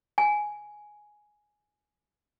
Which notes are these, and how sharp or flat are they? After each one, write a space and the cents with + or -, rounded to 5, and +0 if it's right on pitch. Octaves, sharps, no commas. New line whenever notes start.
G#5 +5